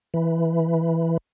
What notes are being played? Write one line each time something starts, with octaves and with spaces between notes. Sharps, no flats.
E3